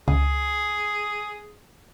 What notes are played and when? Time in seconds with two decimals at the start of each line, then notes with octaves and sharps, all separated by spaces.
0.08 C#2 G#4